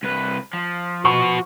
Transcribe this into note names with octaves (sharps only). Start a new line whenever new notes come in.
C2 B4
F3
F#4 B4 C#6